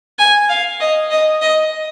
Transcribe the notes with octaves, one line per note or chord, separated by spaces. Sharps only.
G#5
F5
D#5
D#5
D#5